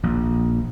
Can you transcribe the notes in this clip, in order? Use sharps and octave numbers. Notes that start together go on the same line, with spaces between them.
A#1